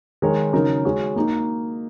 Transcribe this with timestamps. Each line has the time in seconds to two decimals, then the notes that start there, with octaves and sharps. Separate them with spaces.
0.22 D#3 G#3 D#4 A#4 C#5
0.53 C#3 F#3 D#4 A#4 C#5
0.85 G#3 F#4 C#5
1.16 A#3 D#4 F#4